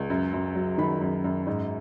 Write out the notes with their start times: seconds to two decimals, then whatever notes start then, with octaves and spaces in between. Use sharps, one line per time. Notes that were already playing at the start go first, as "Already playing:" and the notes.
Already playing: C#2
0.10 F#2
0.33 F#2
0.55 F#3
0.78 D#3 B5
1.01 F#2
1.24 F#2
1.47 G#2